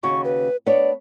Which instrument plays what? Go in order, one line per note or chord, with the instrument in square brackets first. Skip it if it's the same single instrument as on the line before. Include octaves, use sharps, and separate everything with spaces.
[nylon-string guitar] D#2 C#3 F#4 [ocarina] C#6
[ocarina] B4
[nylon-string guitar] B3 D4 C#5 [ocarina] D5